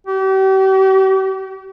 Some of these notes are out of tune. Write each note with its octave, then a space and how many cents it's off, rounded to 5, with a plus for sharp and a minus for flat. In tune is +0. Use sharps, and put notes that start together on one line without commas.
G4 -40